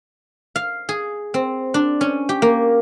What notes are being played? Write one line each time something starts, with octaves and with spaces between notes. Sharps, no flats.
F5
G#4
C4
D4
C#4
G4
A#3